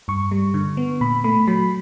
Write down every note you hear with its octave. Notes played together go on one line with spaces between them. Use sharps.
G2 C#6
G3
D3
B3
A#2 B5
A3 B5
F#3 B5